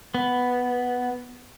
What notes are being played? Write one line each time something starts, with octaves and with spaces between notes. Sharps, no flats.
B3